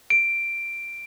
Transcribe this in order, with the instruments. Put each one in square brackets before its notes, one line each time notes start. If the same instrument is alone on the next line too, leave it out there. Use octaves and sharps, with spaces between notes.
[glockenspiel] D7